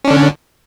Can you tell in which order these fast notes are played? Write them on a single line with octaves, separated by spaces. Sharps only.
C#4 D4 D3